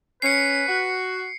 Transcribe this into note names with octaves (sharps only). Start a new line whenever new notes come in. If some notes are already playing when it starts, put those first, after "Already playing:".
C#4 B4 C7 C#7
F#4